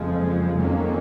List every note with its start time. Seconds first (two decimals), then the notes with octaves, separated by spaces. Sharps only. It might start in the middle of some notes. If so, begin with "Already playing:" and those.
Already playing: F#1 F2 F3 G#3
0.56 F2 D#3 F#3 A#3 C#4